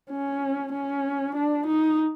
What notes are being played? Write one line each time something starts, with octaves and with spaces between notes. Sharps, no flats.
C#4
C#4
D4
D#4